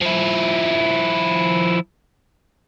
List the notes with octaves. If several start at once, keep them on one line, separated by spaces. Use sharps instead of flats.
F3 E4